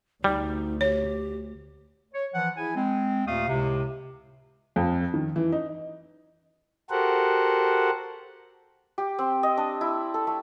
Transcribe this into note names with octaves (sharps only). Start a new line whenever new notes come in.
D2 G3 D#4
G4 C#5
C#5
E3 F3 F#5
E4 G#4 G#5
G#3 C4
D#2 A#2 A3 F5 D#6
C#2 A2 C3
F2
D#3
E3
D#4
F#4 G4 A4 A#4 C5 F#5
G4
C4
D#5
D4
E4
A4
A3